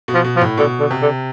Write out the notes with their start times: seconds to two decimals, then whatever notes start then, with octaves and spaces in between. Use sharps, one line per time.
0.08 B2
0.14 F3
0.24 B2
0.36 F3
0.42 A2
0.57 B2 D3
0.79 D3
0.91 C3
1.02 D3